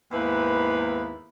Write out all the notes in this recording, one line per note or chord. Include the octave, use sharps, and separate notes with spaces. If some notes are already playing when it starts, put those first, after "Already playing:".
D#2 G#2 A#3 B3 E4 B4